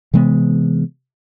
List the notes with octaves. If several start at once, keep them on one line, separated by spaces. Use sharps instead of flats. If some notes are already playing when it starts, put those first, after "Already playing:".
C3 E3 G#3 B3